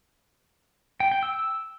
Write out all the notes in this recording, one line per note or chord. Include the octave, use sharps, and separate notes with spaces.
G5
G5
E6